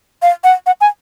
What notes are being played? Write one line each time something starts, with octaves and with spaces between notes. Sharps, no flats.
F5
F#5
F#5
G#5